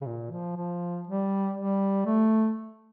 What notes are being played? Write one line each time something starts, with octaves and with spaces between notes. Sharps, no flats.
C#3
A#2
F3
F3
G3
G3
A3